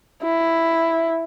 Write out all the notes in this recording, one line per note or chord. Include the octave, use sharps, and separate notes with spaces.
E4